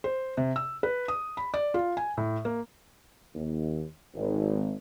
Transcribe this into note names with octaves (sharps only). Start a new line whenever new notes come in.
C5
C3
E6
B4
D#6
B5
D5
F4
G#5
A2
A#3
D#2
G#1